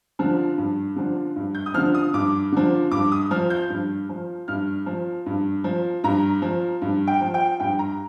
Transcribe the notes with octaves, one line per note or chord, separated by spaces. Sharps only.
D3 F3
G2
D3 F3
G2
G6
D#6
D3 F3 F6
D#6
G2 D6
D3 F3
G2 D6
D#6
F3 F6
G6
G2
F3
G2 F6
F3
G2
F3
G2 A#5
F3
G2
G5
F3
G5
G2 G5
A#5